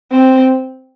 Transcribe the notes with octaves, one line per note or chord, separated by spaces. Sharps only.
C4